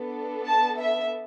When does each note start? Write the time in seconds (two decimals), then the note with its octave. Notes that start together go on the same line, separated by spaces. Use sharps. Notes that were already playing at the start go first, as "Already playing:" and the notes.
Already playing: B3 D4 A4
0.45 A5
0.79 E5